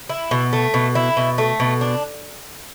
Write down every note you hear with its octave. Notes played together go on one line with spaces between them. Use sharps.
E4
B2
A3
B2
E4
B2
A3
B2
D4